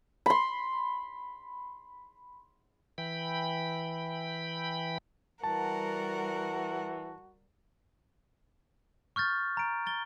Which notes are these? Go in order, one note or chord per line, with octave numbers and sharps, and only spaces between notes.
B5 C6
E3 G5 B5
E3 G3 F#4 A#4 F#5 A5
C#6 F6 G6 A6
A#5 D7
A6 G7